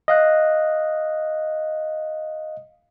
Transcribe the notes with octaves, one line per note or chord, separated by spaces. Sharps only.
D#5 F5 F#6